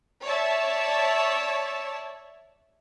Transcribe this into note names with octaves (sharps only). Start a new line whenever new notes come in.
C#5 D5 E5 A5